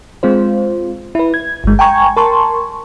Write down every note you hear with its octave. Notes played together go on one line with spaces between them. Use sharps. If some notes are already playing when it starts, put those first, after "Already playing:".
G#3 C4 F4 C5
E4 B4
G#6
G1 G#3
G5 G#5 A#5 C#6 G#6
A#4 A5 C6 C#6